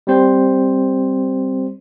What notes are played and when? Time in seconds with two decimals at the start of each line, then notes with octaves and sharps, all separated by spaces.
0.07 G3 C4 C5